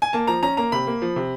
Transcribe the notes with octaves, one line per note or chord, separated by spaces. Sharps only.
G#5
A#3 A5
F3 A#5
C#4 A#5
A#3 A#5
C3 B5
A#3
F3
C3